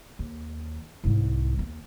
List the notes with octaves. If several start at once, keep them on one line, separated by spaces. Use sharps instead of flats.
D#2
C2 G#2
D#2 B3